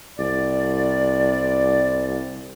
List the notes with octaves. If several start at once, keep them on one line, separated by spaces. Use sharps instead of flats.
C2 D5